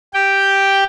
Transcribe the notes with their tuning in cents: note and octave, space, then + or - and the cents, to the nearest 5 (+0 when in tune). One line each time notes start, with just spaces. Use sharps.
G4 +0 G5 +0